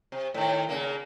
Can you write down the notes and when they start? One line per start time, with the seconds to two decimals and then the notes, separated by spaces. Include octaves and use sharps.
0.12 C3
0.34 A2 D#3
0.69 A#2 C#3 A#3